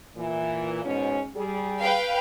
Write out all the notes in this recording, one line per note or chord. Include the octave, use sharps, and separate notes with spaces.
A#2 E3
G#2 B2 C#4
G3 G#4
B4 F5 G5